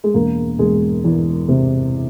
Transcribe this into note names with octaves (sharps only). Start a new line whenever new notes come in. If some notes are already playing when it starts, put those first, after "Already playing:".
G#3
E1 A#3
E1 G#3
E2
C3